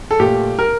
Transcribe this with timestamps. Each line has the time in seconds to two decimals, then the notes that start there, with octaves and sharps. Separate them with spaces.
0.11 A4
0.20 A#2 A3 G4
0.59 A#4